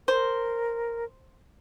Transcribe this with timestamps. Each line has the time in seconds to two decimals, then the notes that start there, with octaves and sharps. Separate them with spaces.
0.08 A#4 C5